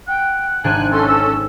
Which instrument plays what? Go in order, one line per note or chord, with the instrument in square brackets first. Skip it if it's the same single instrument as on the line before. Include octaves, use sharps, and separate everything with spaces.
[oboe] F#5 [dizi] G5
[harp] G#1 D4 C5 [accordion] G#5 F#6 [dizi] A#5
[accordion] C#4 A4 [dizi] C6
[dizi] E6